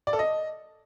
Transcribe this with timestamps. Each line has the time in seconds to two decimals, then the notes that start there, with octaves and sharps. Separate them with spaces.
0.07 D5
0.13 A4
0.19 D#5